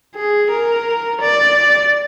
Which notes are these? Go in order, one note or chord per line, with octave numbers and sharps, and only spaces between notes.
G#4
A#4
D5